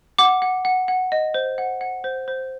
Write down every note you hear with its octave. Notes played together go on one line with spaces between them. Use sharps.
F#5 D6
F#5
F#5
F#5
D#5
C5
F#5
F#5
C5
C5